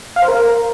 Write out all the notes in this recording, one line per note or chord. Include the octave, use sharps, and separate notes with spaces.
F5
C5
A#4